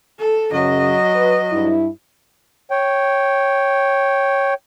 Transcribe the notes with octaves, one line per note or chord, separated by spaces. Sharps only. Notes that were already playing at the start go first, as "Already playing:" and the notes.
A4
F#2 C#3 F#3 D#5
B4
G2 E4
C#5 G5